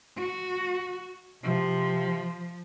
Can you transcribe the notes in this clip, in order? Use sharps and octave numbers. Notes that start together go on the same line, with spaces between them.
F#4
C3 F3